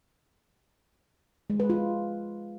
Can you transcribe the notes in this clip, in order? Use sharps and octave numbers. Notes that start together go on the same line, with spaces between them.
G#3
B4
F4